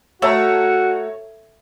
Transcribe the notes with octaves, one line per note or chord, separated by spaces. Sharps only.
A3 F#4 C#5 A5 A#5